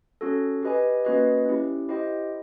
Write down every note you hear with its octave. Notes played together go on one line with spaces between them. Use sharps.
C#4 F#4 A4
G4 B4 D#5 G#5
A#3 C#4 F#4 B4 D#5
C#4 E4 G4
E4 G4 C5 D#5 G5